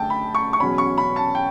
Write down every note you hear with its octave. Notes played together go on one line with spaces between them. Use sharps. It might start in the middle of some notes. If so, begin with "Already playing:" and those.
Already playing: F#2 D3 A3 G5 A5
B5
C#6
C#6
E2 B2 F#3 C#4 B5
C#6
B5
A5
G5